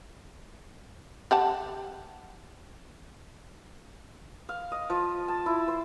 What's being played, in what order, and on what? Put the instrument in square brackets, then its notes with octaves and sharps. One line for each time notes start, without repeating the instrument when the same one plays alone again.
[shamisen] G4 F#5 A5
[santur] F5
D#5
F3
A5
E4
C5